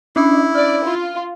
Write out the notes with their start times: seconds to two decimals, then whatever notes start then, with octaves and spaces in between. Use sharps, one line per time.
0.16 C#4 D4 E4 B5
0.55 D5 F6
0.85 F4